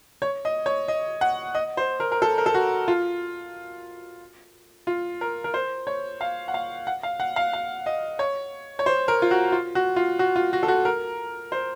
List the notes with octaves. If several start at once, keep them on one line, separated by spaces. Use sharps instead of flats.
C#5
D#5
C#5
D#5
F#5
D#5
C5
A#4
A#4
A4
A#4
A4
F#4
F4
F4
A#4
A#4
C5
C#5
F5
F#5
F5
F#5
F5
F#5
F5
F5
D#5
C#5
C#5
C5
A#4
F4
F#4
F4
F#4
F4
F#4
F4
F#4
A4
F#4
A#4
C5